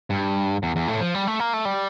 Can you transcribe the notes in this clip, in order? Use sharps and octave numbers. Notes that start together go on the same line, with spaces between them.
G2
E2
E2
A2
F3
G3
A3
A#3
A3
G3